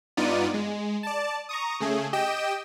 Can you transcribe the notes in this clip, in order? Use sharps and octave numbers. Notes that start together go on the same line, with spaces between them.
G2 B3 D#4 F4 D5 D#7
G#3
D5 A5
A#5 C#6 D#6
C#3 A3 G#4
G4 D#5 G5 E7